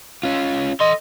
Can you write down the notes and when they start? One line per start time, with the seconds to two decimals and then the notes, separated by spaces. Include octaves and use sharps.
0.23 C#4 F4
0.80 A4 D#5 C6